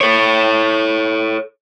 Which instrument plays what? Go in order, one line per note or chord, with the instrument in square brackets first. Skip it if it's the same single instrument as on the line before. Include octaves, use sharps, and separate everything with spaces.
[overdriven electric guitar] A4 C#5